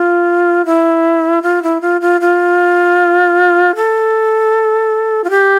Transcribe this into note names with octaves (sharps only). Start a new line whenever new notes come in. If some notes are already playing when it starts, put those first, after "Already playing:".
Already playing: F4
E4
F4
E4
F4
F4
F4
A4
F4
G4